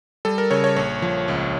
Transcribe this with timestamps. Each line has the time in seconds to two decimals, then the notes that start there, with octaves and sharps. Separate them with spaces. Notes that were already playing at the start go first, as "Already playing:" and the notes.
0.25 G3 A4
0.38 A#4
0.51 C#3 C#5
0.64 C#5
0.76 A#1 C#5
1.02 F3
1.28 C#2